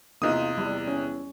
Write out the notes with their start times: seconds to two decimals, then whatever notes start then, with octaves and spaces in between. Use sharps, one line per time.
0.22 E2 C3 A#3 D#4 F4 D#6
0.58 E2 G3
0.88 C#4